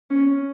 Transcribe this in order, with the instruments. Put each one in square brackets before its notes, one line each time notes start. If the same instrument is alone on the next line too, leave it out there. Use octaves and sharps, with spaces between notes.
[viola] C#4